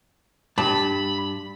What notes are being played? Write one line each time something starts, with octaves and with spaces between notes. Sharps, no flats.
G2 A5 B5